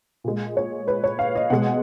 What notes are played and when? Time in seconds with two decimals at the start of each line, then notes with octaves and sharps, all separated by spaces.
0.24 A#2 G#3
0.57 C#5
0.88 B4
1.04 C#5
1.19 F5
1.36 D#5
1.50 B2 G#3 F#5